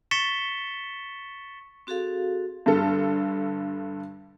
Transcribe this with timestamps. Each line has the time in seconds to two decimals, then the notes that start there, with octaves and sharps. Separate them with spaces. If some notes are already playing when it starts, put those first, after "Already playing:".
0.11 C#6 A6 B6 C#7 E7 G7
1.87 C4 F#4 G#4 A4 F5
2.66 G2 D3 A4